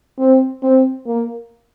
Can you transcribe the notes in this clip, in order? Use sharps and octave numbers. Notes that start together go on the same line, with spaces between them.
C4
C4
A#3